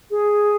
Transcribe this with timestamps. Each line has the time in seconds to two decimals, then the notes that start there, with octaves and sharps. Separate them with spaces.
0.11 G#4